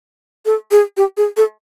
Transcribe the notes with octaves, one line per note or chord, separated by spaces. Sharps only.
A4
G#4
G4
G#4
A4